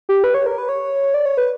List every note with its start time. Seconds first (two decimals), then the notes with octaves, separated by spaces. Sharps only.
0.09 G4
0.24 B4
0.34 C#5
0.46 A#4
0.58 B4
0.69 C#5
1.14 D5
1.26 C#5
1.37 B4